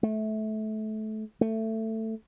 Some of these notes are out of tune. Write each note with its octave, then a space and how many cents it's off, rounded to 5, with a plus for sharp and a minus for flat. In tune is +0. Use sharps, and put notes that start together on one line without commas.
A3 -25
A3 +15